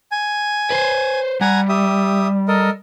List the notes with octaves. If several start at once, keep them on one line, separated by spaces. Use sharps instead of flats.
G#5
B4 C5
G3 F#5 G#5 A#5
G4 E5 D#6
A4 A#4 D#5